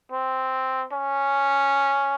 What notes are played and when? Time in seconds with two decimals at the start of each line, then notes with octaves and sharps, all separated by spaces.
0.12 C4
0.93 C#4